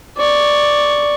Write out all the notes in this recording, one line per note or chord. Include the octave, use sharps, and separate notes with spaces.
D5 C#6